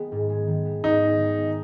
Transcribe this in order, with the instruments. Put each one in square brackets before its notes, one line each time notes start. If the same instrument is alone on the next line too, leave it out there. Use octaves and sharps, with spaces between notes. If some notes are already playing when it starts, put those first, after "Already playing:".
Already playing: [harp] D#3 G#3 B3
G#2
G#3
D#3
B3
[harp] G#2 [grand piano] D#4
[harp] G#3
D#3
B3